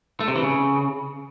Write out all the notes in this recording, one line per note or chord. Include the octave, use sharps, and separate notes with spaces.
A3
C3
E3
C#3